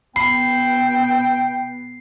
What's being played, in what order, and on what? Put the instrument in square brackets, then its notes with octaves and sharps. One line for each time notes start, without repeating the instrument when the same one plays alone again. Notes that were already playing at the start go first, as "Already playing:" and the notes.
[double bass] B2 B3 [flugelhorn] G5 [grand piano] B5 [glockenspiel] C7